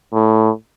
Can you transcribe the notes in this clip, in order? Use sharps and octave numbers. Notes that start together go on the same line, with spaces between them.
A2